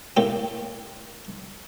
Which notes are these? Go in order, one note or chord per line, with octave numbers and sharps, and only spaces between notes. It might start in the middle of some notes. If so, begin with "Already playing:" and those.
A2 A#3 G4